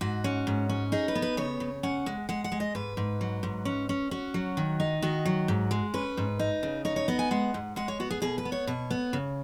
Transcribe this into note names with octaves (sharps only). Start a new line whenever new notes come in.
G#2 F#4
C#4
G#2
C#4
D#4 G#4
B4
B3
B4
C#3 C#5
C#3
C#4 F#5
G#3
G#3 F#5
F#5
G#3
D#5
G#2 B4
G#2
F#3
G#2
C#4
C#4
C#4 F#4
F#3
D#3
D#4
D#3 F#4
F#3
G#2
G#3
C#4 B4
G#2
D#4
C#3
D#4 C#5
C#5
B3 D#5
G#5
G#3 F#5
G#2
G#3 F#5
C#5
B3 F#4
G#4
B2 G#4
B4
B3
C#5
B2 C#5
B3
C#3